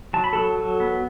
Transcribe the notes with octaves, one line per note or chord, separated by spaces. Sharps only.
F#3 A5
B5
F#3 A4 A5
F#3
B3